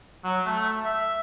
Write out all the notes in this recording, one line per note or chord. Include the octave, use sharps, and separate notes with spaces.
F#3
A3
E5